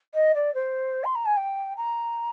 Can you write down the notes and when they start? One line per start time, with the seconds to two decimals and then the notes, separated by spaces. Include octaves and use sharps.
0.14 D#5
0.34 D5
0.54 C5
1.04 C6
1.15 A#5
1.25 G#5
1.36 G5
1.77 A#5